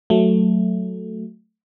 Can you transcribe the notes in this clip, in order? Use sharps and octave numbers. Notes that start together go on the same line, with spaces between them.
F#3 A3